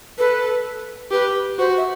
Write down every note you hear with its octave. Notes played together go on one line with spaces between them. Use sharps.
A4 B4
G4 B4
F#4 C5
E5